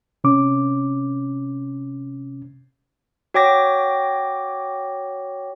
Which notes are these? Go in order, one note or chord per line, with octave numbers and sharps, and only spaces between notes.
C3 C#4 D6
F#4 C#5 G5 D6 A#6